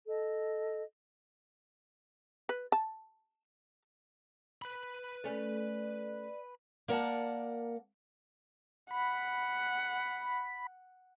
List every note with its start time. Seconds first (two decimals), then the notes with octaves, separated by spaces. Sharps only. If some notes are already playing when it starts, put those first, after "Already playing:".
0.07 A4 D#5
2.49 B4
2.72 A5
4.62 B4 B5
5.24 A3 C#4 D5
6.88 A#3 A#4 D5 F#5 A5
8.91 F#5 B5